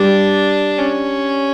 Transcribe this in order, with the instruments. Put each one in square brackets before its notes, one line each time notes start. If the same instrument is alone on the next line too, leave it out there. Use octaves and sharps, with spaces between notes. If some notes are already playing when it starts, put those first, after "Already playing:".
Already playing: [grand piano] G3 [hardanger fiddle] D4
[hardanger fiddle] C#4